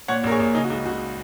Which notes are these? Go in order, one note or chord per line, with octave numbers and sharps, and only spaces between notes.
A#2 C#5 F#5
A#1 A#4
G#4 C#5
A#1
C#3 D#4 G#4
F#4
C#2 D#4
C#2 F#4